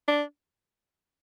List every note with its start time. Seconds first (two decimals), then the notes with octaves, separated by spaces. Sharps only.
0.08 D4